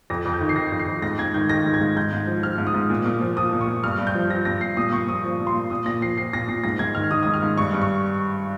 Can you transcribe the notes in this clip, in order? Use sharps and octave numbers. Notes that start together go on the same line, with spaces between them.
F2 A#6
F2
G6
D#3
C7
D#3 A#6
F2
C7
F2
G#2 A#6
G#2 G#6
D#3 G6
D#3 A#6
G#2
G#6
G#2
G#2 G6
G#2
F3
F3 F6
G#2
D#6
G#2
A#2
A#2
F3
F3 D#6
A#2
C#6
A#2
G2 F6
G2
G6
F3
F3 A#6
G2 A#6
G2 C7
A#2 D#6
A#2 C#6
F3 D#6
F3
A#2
C6
A#2
A#2 D#6
A#2 A#6
F3 C7
F3 C7
A#2 A#6
A#2 C7
G#2 A#6
G#2 G#6
D#3 F6
D#3 D#6
G#2 D#6
F6
G#2
G2 C#6
G2
C#6